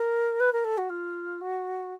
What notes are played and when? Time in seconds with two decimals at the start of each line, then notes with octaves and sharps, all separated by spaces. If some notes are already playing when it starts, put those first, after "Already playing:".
Already playing: A#4
0.40 B4
0.52 A#4
0.64 A4
0.77 F#4
0.89 F4
1.41 F#4